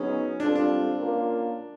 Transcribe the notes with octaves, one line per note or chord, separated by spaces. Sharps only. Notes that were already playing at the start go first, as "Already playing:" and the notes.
Already playing: F#3 B3 C#4 D#4 G#4 B4
G3 C4 D4 F4 A4
D4
A#3 C#4 F4 A#4